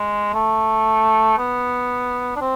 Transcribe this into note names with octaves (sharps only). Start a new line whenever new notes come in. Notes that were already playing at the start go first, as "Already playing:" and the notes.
Already playing: G#3
A3
B3
D4
C4